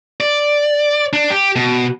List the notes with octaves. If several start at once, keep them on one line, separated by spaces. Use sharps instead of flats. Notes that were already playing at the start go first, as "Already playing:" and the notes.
D5
D4
G4
B2